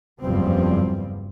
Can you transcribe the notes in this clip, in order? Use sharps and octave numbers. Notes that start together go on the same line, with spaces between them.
F#1 E2 G2 F3 G3 C4